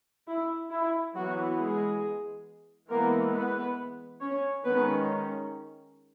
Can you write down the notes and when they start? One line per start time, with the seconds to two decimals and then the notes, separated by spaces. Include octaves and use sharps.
0.28 E4
0.71 E4
1.15 E3 F#3 B3 F#4
1.59 G#3 G#4
2.89 E3 G#3 A#3 B3 A#4
3.33 B3 B4
4.21 C#4 C#5
4.65 D#3 G#3 B3 C#4 B4